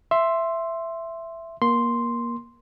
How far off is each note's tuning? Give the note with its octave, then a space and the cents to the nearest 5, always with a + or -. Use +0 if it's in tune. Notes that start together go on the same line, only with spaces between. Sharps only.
E5 +10 C6 +5
A#3 +20 C6 +0